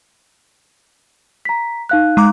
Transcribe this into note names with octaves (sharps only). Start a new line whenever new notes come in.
A#5 B6
D#4 F5 F#6
G#3 A#5 D6